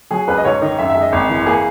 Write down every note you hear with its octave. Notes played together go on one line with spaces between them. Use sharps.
F#3 G#4
C#2 B4
D#5
G#2 C#5
D#3 D#5
F#2 E5
E5
G#3
D#5
G#1
E3
A#3 G#4